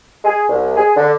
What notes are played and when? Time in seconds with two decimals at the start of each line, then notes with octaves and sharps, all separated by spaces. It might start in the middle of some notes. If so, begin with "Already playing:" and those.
0.25 G#4
0.49 C2
0.76 G#4
0.97 D3